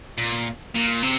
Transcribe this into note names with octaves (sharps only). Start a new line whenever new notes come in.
A#2
A#2
C3